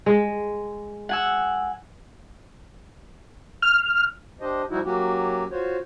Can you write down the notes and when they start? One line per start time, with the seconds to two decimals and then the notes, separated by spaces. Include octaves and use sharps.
0.06 G#3
1.09 F#5 G#5 E6
3.62 F6
4.41 D4 G4 C5 D#5
4.70 F3 G3 D#4 E4 F#4
4.84 F#3 A#3 C#4 F#4 G4
5.51 F4 F#4 C5 C#5